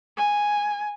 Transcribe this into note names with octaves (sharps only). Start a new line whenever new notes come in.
G#5